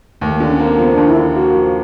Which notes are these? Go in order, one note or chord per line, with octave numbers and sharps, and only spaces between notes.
D#2 A3
D3 A#3
C#4
A#3 C4
F3 B3
D4
D#2
E4
D3
A#3 F#4
F3